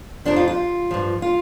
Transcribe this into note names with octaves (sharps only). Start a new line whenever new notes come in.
F2 C3 F3 D4
F4
F4
G2 F3
F4